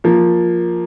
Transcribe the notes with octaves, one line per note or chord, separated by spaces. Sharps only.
F3 A#3